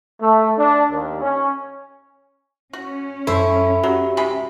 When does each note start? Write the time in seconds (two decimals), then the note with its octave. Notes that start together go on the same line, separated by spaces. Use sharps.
0.21 A3
0.58 D4
0.91 D#2
1.22 C#4
2.73 C#4 F#4
3.27 F#2 E4 A4 C5 C#5
3.83 F#3 F#4 G4
4.17 C3 G#3 B5